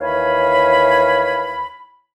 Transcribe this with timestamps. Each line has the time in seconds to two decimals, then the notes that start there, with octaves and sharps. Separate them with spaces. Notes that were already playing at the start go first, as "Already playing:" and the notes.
0.01 D#2 E3 C#5 F5 G#5 B5